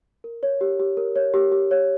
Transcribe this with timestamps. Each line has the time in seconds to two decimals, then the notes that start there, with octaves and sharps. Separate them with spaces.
0.24 A#4
0.43 C#5
0.61 G4
0.80 G4
0.97 A#4
1.16 C#5
1.34 G4
1.52 G4
1.71 C#5